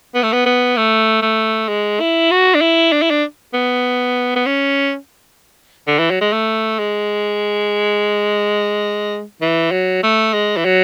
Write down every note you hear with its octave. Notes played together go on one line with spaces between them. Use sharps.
B3
A3
B3
B3
A3
A3
G#3
E4
F#4
D4
E4
D4
E4
D4
B3
B3
C#4
D3
E3
F#3
G#3
A3
G#3
E3
F#3
A3
G#3
E3
F#3